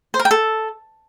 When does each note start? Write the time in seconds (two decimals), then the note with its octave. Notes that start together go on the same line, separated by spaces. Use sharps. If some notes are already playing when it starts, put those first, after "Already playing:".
0.14 C5
0.19 A#4
0.25 G5
0.31 A4